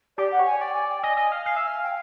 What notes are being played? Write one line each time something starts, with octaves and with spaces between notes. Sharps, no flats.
G4 D5
F#5
C#5
G#5
D5 G5
G#5
G5
D#5 G#5
D#5
F5
F5 G#5
E5
F5
G5